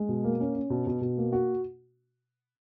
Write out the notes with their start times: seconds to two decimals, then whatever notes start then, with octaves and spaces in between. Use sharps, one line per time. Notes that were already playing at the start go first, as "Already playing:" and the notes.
Already playing: G#3
0.09 B2
0.24 A#3
0.40 C#4
0.55 C#4
0.70 B2
0.87 B2
1.01 B2
1.17 A#3
1.32 F#4